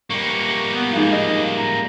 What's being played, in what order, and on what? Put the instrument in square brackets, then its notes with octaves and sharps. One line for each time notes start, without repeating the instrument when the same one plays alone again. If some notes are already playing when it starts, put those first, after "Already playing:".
[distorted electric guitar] G3 A#3 [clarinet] C#6
[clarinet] B3
[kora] G#2 F3 [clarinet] D#4
[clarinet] D#5 [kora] F5
[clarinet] A#5